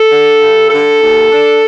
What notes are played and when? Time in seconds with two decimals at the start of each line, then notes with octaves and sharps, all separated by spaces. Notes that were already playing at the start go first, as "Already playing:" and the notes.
Already playing: A4
0.09 D3
0.40 G2
0.70 D3 A4
1.00 D#2
1.31 D4